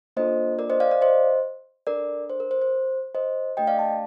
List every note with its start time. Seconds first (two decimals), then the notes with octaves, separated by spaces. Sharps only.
0.17 A#3 D4 F4 A4 C5 D#5
0.59 A#4 D5
0.70 C5 D#5
0.80 D5 F5
0.91 D5 F5
1.01 C5 D#5
1.87 D4 A4 A#4 D5
2.30 C5
2.40 A#4
2.51 C5
2.62 C5
3.15 C5 D#5
3.57 A3 D4 G4 D#5 G5
3.67 D5 F5
3.78 F5 A5